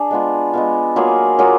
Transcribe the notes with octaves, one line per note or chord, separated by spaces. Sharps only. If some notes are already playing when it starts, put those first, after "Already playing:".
Already playing: D4 G#4
G#3 B3 F4
G#3 B3 F4
F#3 A#3 F4 G#4
F#3 A#3 F4 G#4